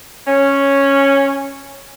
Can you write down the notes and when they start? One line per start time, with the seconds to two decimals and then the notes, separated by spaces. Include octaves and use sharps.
0.27 C#4